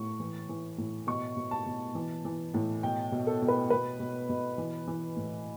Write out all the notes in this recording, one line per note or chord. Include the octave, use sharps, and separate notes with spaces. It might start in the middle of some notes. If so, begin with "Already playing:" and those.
Already playing: A2 C#6
E3
E3
A2
B2 C#6
B2
A5
B2
E3
E3
A2
B2 G5
B2
A4
B2
B4
B2 B4
B2
B2
E3
E3
A2